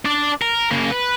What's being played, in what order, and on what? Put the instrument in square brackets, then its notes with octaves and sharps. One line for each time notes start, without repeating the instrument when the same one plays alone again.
[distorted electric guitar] D4 D5
A#4
C#3 A#3
B4